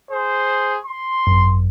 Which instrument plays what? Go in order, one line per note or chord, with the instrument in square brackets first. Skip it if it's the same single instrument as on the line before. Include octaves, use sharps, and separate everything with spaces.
[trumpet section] G#4 C5
C6
[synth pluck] G#1 F#2